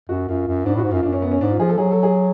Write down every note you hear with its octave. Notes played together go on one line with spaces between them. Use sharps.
F#2 F#4
F#2 F4
F#2
G#2 D4
A2 F#4
G#2
F#2 F4
F#2 D4
C#4
B3
C#4
G#2 D4
F4
F3 G#4
A4
F#3 G#4
A4
G#4